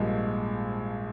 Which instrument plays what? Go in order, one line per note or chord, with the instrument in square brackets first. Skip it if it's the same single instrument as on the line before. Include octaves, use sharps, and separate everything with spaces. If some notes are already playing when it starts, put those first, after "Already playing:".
Already playing: [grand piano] A#1 G#2 F3 G#3 [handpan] G3 A#3